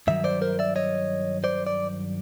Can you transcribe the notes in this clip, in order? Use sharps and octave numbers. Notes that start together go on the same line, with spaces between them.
G2 D#3 F#3 E5
C5 D5
A#4 C5
D5 E5
C#5 D#5
C5 D5
D5